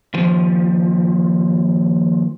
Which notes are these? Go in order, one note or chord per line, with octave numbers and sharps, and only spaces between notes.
D#2 F3